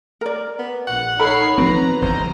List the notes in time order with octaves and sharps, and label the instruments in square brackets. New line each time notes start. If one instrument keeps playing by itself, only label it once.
[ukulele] A#4 D5
[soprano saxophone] B3
[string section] A#1 [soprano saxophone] F#5
[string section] D#4 C#5 C7 [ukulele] A4 A#4 B5
[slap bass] F3 B3 C4 [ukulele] F#4 [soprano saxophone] B4 [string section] A#5
[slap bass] G1 E2 D3 [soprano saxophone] C5 [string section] D#5 A#5